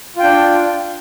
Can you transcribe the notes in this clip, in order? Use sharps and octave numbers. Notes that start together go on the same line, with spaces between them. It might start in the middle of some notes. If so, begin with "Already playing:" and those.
D4 F4 G5